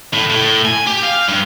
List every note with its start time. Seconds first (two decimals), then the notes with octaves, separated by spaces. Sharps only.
0.14 A2
0.30 A2
0.65 G#5
0.87 G4
1.03 F5
1.29 G2